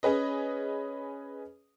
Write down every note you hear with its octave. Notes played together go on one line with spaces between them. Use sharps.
C#4 G#4 B4 D#5